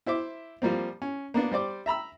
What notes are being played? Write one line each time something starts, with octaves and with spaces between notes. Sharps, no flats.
E4 C5 E5 D6
F3 G3 A#3 C4
C#4
A#3 B3 D4
G3 C5 D5 D6
E5 A#5 B5 E6